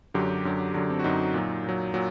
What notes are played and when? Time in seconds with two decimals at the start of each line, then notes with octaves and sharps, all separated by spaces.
0.14 F#2 D3 F#3 G4
0.45 F#2 D3 F#3
0.74 F#2 D3 F#3 D4
0.90 C4
0.99 F#4
1.04 F#2 D3 F#3 D#4
1.34 A#2 F#3
1.64 A#2 F#3
1.94 A#2 F#3